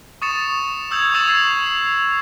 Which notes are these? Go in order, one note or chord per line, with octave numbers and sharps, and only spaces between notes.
C#6 D#6 A6 C#7 E7
D#6 E6 G6 G#6 F7
C#6 D#6 E6 A6 E7 F#7
G6 G#6 C7 E7
C7